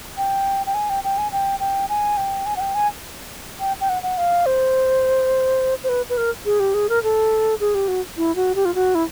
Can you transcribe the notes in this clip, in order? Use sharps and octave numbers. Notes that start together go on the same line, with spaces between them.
G5
G5
G#5
G5
G5
G#5
G5
G5
G#5
G5
G#5
F#5
G5
G#5
G5
G5
F#5
F#5
F5
C5
C5
B4
B4
A#4
G#4
G4
G#4
A#4
A4
G#4
G4
F#4
E4
F#4
G4
F4
F#4
E4